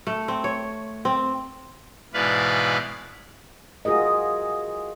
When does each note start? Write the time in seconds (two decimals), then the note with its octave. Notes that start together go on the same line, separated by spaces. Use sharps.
0.07 A3
0.28 C4
0.44 C#5
1.05 C4
2.14 G#2 B2 E3 B4 D5 F5
3.85 F4 F#4 G#4 A#4 D#5